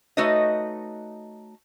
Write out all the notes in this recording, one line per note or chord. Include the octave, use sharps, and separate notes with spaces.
A3 D#4 F#4 B4 C#5 D#5